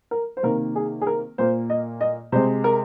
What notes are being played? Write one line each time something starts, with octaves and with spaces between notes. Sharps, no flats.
A#4
C5
C3 D#3 A#3 A#4
G#4
G#4
A#4
A#2 A#3 C5
D#5
D#5
C3 G#3 C5
A#4